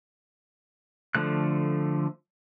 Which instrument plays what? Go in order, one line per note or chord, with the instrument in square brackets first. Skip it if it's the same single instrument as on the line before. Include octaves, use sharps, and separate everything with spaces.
[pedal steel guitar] D3 F3 A3 F#6